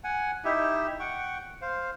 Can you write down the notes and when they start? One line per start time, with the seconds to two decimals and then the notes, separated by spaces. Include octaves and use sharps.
0.04 F#5 G#5
0.45 D#4 E4 G4 E5
1.00 F#5 G5 C#6
1.62 C5 F5